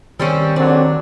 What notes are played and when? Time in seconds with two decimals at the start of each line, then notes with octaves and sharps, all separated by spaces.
0.20 D#3 G3 C4 C#4
0.56 D#2 D3 F#3 C4 D4